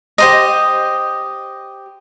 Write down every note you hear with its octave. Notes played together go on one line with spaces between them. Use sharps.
G4 C5 D#5